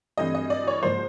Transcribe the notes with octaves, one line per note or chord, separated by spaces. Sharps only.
G2 E3 A3 C4 D#5
D#5
D5
C#5
G#2 F3 A#3 C5